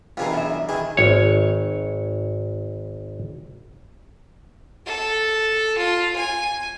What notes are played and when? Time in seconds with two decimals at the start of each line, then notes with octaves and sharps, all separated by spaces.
0.17 G2 B2 E3 F4 G#4 A#4
0.33 F#2 E5
0.69 D#3 E3 G#4
0.97 G#1 C#5
4.86 A4
5.77 F4
6.16 G#5